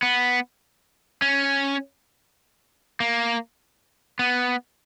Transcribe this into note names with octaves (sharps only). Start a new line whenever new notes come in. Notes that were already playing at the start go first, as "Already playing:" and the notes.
B3
C#4
A#3
B3